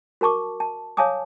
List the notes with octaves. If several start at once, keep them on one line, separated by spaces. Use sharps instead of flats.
F#4 A#4 A5 C#6 D6
A5
C#5 F5 G#5 A5 D6 D#6